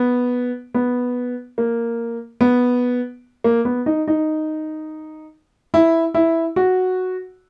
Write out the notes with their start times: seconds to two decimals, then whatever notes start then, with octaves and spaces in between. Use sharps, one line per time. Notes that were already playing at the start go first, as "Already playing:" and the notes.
Already playing: B3
0.74 B3
1.58 A#3
2.41 B3
3.44 A#3
3.65 B3
3.86 D#4
4.08 D#4
5.74 E4
6.14 E4
6.56 F#4